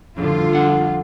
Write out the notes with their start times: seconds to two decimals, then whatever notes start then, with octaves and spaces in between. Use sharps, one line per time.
0.18 F2 A2 D3 G3 F4
0.55 F2 D4 F#5